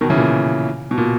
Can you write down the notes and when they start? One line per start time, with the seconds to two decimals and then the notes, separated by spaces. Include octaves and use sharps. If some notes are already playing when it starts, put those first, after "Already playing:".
0.01 B2 D#3
0.10 C#3 E3
0.17 A#2
0.91 B2
0.98 A#2